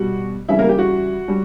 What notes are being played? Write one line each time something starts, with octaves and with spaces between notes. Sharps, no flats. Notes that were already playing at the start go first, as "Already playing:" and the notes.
Already playing: B2 G3 F#4
C#3 E3 G3 E4 E5
A#3 A#4
G4
F#4
G3